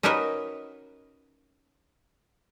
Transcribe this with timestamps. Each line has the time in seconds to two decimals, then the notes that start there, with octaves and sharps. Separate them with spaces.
0.03 C#4 D#4 F#4 A#4 B4 D#5